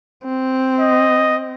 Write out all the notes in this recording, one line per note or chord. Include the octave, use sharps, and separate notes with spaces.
C4
D#5